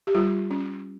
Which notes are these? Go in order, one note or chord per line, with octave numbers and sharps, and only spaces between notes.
G4
G3 F4
C#4